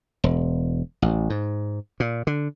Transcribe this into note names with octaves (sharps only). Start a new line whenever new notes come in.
E1
A1
G#2
A#2
D3